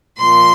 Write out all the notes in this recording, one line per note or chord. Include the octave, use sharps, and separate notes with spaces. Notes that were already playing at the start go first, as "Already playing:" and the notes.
A#2 F3 C6